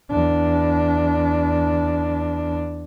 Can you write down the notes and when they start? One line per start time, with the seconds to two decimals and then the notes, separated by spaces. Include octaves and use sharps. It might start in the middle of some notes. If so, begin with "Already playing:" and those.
0.11 E2 D4